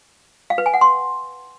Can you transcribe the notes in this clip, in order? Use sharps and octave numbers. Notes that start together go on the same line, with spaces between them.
F5
B4
G#5
F#5
C6